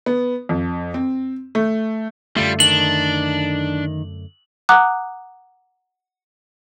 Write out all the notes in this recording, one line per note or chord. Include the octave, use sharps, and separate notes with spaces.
B3
F2
C4
A3
F#2 D3 G3 A3 F4
D#3 D4 F#7
F#5 A#5 D6 D#6 F#6